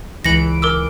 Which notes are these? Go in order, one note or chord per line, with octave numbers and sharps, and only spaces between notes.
C#2 E3 A#6 C#7 D7 F#7
A#4 D6 E6